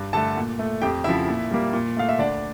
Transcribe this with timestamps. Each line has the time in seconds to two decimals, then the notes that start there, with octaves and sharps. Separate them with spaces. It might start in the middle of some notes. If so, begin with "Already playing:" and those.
Already playing: G2
0.13 D3 A3 A4 A5
0.37 A#2
0.59 A3
0.82 F2 G4 G5
1.04 C#3 F3 E4 E5
1.28 A#2
1.51 G3 A#3
1.73 A#2
1.97 A3 F5
2.09 E5
2.19 D2 D4 D5